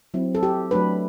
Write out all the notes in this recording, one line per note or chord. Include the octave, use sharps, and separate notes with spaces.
F#3 C4 E4
A4
G4
F#3 A3 D4 B4